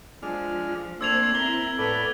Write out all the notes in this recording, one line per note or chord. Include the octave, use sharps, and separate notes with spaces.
F3 G#3 D4 F6
A3 A#3 C4 D4 C5 E6 G#6 F7
C4 E4 A#4 G7
A2 B3 A4 B4 D5